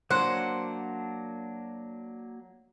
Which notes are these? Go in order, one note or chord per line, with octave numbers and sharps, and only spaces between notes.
F#3 A#3 D4 C5 F#5